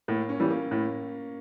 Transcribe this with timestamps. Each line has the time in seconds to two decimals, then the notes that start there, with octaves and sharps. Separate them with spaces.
0.08 A2 A#3
0.29 C#4
0.40 E3 G3 C#4
0.50 A#3
0.71 A2